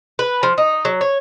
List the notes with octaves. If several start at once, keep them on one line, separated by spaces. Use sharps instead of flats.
B4
F3
D#4
F#3
C#5